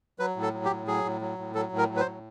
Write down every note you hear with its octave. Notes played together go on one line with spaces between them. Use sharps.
F#3 B4
A2
A4
F#3
G4
A2
F#3 G#4
A2
F#3
A2
F#3 A4
A2
A#4
F#3
B4
C5
A2